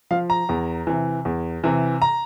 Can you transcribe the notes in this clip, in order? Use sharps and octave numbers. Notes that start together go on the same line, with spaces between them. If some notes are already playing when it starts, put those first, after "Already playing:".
F3 F5
A#5
E2
C3 E3
E2
C3 E3
A#5